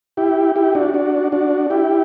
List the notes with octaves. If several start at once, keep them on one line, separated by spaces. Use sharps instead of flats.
E4 G4
E4 G4
D4 F#4
D4 F#4
D4 F#4
E4 G4